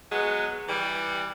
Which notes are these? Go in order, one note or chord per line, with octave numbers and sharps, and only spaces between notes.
F#3 G#3 B3
E3 G3